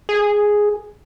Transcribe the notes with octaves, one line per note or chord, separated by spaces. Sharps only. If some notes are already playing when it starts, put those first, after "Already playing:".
G#4